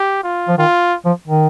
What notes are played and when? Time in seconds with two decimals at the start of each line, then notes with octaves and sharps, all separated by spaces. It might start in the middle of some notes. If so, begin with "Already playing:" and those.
Already playing: G4
0.23 F4
0.48 F3
0.58 D#3 F4
1.05 F3
1.28 D#3